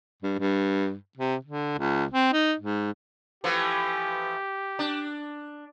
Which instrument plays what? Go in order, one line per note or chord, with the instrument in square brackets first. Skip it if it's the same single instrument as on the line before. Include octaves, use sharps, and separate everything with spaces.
[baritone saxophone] G2
G2
C3
D3
C#2
C4
D#4
G#2
[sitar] E3 F3 A3 [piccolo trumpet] G4
[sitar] D4